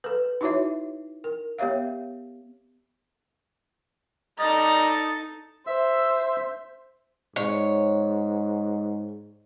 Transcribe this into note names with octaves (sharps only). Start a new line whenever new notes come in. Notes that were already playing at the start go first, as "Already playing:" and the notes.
A4 B4
D#4 E4 F#4 C#5 E5
A#4
B3 G4 C#5 E5 F5
G3 D#4 A4 D5 D#5 A#5 A6
C5 E5 E6
G#2 C#5